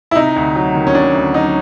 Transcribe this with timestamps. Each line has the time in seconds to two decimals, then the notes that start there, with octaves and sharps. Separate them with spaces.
0.11 E4
0.15 C3 D#4
0.36 D2
0.56 F#3
0.75 D#3
0.87 C#4
0.95 C3 D4
1.14 D2
1.34 F#3 D#4